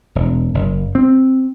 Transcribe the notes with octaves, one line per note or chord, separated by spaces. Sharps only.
E1
F#1
C4